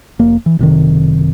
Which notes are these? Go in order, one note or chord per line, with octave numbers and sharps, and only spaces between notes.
F1 A#3
E3
F#1 C3 D#3